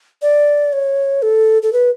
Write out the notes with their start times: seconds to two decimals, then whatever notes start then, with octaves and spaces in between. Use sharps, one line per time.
0.22 D5
0.73 C#5
1.22 A4
1.62 A4
1.73 B4